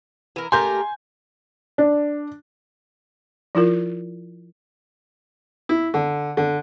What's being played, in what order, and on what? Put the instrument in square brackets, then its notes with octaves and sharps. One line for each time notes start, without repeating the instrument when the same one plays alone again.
[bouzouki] E3 A#4
[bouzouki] A3 G4 A#4 [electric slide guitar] G#5 [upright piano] C6 G6
[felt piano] D4
[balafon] F3 E4 F4 A#4
[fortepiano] E4
D3
D3